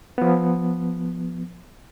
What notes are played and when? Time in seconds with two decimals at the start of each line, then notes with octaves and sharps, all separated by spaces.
0.18 F3 B3